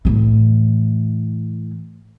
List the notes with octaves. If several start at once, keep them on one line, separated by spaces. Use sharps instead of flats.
A2 E3